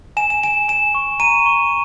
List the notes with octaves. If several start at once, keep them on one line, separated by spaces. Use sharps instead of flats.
G#5 E7
E7
G#5 E7
G#5 E7
C#6
A#5 D#7
C#6